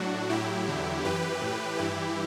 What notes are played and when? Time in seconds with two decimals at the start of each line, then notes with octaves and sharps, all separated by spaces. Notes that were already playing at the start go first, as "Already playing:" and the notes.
Already playing: A2 F#3 D4 F#4
0.30 A2 F#3 E4 G4
0.68 E2 D3 F#3
1.05 F#2 E3 G4 B4
1.41 A2 E3
1.78 G2 E3 E4 G4